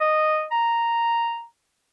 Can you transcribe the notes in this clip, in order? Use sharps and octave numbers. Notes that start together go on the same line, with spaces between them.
D#5
A#5